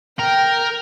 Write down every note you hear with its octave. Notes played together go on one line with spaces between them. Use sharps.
A#4 G5